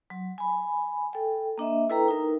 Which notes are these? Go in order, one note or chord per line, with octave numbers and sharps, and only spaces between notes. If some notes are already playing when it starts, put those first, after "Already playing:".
F#3
G#5 B5
A4 G5
A#3 D4 D#5 E5
E4 A4 B4 G5 A#5
D#4 A#4